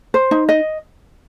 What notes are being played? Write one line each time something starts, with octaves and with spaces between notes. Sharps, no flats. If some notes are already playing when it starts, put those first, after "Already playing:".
C5
D#4
D#5